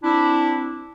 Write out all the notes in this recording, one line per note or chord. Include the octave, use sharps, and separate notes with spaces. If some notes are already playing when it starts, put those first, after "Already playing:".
C4 D4 E4